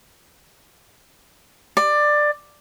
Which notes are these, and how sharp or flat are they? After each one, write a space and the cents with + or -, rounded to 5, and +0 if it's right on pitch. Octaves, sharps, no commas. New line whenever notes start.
D5 +15